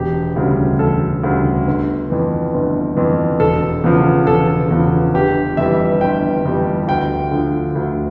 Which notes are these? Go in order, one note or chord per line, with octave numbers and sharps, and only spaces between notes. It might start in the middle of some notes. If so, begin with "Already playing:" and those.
Already playing: E1 G4
D2 C#3 G3
E1 A4
D2 C#3 G3
G1
F2 E3
G1
F2 E3
E1 A4
E2 C#3 F3
E1 A4
E2 C#3 F3
G1 G4
F2 E3 G3 E5
G1 G5
F2 E3 G3
D2 G5
D3 F3
D2